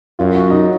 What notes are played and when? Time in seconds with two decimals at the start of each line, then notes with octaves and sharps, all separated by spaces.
0.19 F#2 F4
0.35 F#4
0.50 D#4